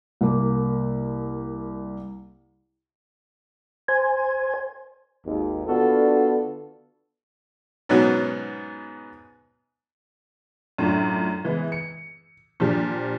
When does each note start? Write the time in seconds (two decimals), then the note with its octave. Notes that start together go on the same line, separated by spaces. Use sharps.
0.21 C2 A#3
3.88 C5 G#5
5.26 G#1 D#2
5.67 D3 B3 D4 F4 F#4 A4
7.89 G#2 B2 F#3 B3 C#4 F#4
10.78 F#2 A2 D4 F4
11.44 E3 G#3 B3
11.72 C#7
12.60 A#2 F3 D4 G4